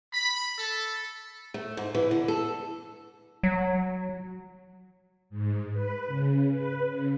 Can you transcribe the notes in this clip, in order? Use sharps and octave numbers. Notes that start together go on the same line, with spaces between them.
B5
A4
A3
G#2
E3
D3
A4
F#3
G#2
B4
C#3
B4
C#3